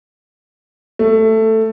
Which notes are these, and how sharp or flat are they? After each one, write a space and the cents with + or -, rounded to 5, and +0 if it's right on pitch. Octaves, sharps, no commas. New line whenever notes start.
A3 +10